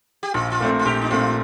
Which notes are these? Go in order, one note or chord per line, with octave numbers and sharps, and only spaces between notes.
G4
A#1 F4
F4
A#2 A3 C4
F4
A#1 G4
D#4
A#2 A3 C4 F4